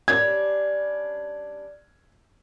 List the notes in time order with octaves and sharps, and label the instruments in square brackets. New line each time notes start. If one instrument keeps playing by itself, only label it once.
[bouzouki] G3 C#4 D4 [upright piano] G#6